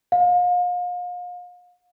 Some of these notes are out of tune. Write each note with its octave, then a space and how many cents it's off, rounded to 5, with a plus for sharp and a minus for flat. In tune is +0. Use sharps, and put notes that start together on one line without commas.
F5 +35